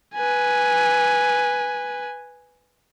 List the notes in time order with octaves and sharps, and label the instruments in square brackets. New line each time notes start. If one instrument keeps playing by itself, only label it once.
[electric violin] B4 G#5